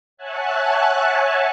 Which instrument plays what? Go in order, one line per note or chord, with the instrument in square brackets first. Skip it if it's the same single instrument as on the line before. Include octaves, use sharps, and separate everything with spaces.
[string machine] C#5 E5 F#5 G#5 A5 F#6